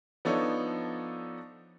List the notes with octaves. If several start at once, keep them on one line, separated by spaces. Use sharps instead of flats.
F3 B3 D4 D#4 A4 C#5